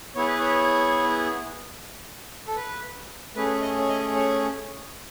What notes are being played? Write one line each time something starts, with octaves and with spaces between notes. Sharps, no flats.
B3 E4 G#4 C#5
B4
C#5
A4
B4
A3 C#4 G#4 B4
D#5
C#5
D#5
C#5